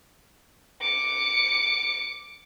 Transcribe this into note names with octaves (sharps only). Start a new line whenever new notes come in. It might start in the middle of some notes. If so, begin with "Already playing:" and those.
D6 C#7